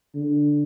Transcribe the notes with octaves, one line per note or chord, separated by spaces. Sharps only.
D3